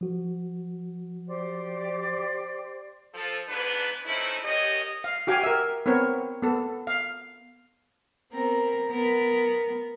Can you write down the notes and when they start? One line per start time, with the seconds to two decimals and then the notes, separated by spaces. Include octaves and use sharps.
0.01 F3 F#4
1.26 G4 C5 D5
3.14 F3 A4
3.49 E2 G#2 B3 D4 B4
4.06 F3 A3 C4 C#4 D#4 E4
4.44 F#2 G4 C#5 D#5
5.04 F5
5.27 F#4 G4 F5 G5 G#5
5.43 A#4 E5
5.86 B3 C4 A#4 C#5
6.42 B3 A4
6.87 F5
8.32 B3 C4 A#4 A#5
8.89 B3 A#4